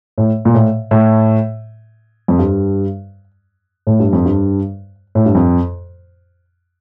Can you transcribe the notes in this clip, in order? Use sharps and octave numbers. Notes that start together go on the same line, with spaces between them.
A2
A#2
A2
A2
F2
G2
A2
G2
F2
G2
A2
G2
F2